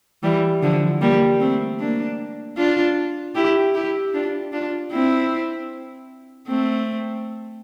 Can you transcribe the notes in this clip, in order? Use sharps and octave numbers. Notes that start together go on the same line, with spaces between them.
E3 G3
D3 F3
G3 A#3
A3 C4
A#3 D4
D4 F4
E4 G4
E4 G4
D4 F4
D4 F4
C4 E4
A3 C4